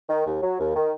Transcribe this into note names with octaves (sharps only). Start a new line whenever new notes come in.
D#3
D#2
F#3
D#2
D#3